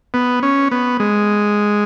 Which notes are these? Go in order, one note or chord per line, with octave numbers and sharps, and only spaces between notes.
B3
C#4
B3
G#3